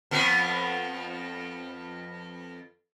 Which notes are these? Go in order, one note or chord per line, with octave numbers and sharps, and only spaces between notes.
F2 F3 B3